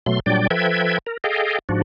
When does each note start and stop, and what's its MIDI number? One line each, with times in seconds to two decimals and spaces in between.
0.06 0.20 47
0.06 0.20 54
0.06 0.20 57
0.06 0.20 84
0.26 0.47 46
0.26 0.47 54
0.26 0.47 55
0.26 0.47 62
0.26 0.47 74
0.26 0.47 79
0.50 0.98 53
0.50 0.98 69
0.50 0.98 71
0.50 0.98 76
0.50 0.98 79
0.50 0.98 92
1.06 1.17 70
1.24 1.59 68
1.24 1.59 69
1.24 1.59 75
1.24 1.59 77
1.24 1.59 79
1.69 1.82 44
1.69 1.82 53
1.69 1.82 62
1.69 1.82 66